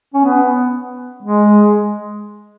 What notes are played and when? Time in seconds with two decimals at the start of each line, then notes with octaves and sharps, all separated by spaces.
0.14 C#4
0.24 B3
1.22 G#3